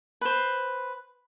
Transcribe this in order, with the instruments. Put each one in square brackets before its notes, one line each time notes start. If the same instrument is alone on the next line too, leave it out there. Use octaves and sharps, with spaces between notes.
[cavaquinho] B4 C5